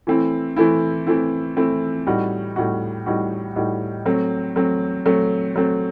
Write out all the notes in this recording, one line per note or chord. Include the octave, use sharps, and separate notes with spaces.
E3 A3 C4 E4
E3 A3 C4 E4
E3 A3 C4 E4
E3 A3 C4 E4
A2 G3 D#4 F#4
A2 G3 D#4 F#4
A2 G3 D#4 F#4
A2 G3 D#4 F#4
F#3 A3 C4
F#3 A3 C4
F#3 A3 C4
F#3 A3 C4